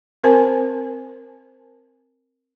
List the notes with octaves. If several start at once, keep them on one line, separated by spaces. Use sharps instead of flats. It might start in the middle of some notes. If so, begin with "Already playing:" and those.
C4 A#4 C5 G#5 A5